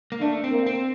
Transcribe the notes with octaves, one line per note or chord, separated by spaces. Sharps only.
A#3
A3 D4
C4
A#3
C4